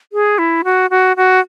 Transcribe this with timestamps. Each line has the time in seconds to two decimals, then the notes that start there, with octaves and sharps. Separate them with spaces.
0.13 G#4
0.38 E4
0.64 F#4
0.90 F#4
1.17 F#4